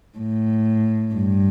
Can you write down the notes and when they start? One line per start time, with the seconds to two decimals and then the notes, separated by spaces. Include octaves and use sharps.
0.18 A2
1.14 G2